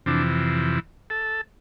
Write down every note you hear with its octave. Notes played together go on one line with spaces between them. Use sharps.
F2 C3 E3 D4
A4